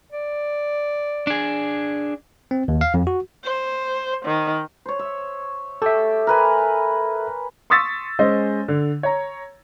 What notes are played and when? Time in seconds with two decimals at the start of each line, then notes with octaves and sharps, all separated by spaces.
0.12 D5
1.27 D4 G#4
2.51 C4
2.68 D#2
2.81 F5
2.94 F2
3.07 F#4
3.44 C5
4.25 D#3
4.86 C5 C#5
4.99 E5
5.82 G4 A4 E5
6.27 A#4 B4 G#5
7.70 C6 C#6 D#6 E6 A6 B6
8.19 G#3 C#4 C5 D#5
8.68 D3
9.03 C#5 A#5